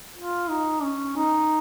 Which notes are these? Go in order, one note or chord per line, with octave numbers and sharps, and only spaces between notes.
F4
D#4
C#4
D#4